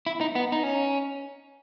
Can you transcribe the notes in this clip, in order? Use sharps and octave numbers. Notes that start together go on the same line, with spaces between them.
E4
D#4
B3
D#4
C#4